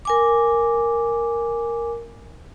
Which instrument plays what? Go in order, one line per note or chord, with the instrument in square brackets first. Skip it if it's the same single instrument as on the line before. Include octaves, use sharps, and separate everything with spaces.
[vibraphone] A#4 G#5 D6